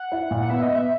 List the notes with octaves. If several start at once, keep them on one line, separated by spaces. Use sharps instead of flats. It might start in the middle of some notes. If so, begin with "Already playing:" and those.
Already playing: F#5
E4
A#2
F#5
B3 E5
D#5
B3
E5